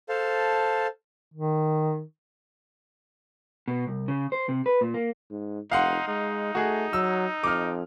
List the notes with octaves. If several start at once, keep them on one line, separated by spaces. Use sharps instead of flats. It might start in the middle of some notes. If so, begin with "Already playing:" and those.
A4 C5 F5 A5
D#3
B2
C2
C#3
C5
C3
B4
A#2
A#3
G#2
F1 D#4 F5 F#5 C6
G#3 D#4
A3 F#4 G#4
F#3 E6
F2 D6 F6